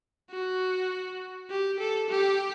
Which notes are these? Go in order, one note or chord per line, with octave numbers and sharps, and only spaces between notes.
F#4
G4
A4
G4